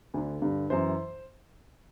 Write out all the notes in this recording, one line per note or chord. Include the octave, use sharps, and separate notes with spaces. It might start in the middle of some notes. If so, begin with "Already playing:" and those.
D2 D3
G2 D3
F#2 E3 C5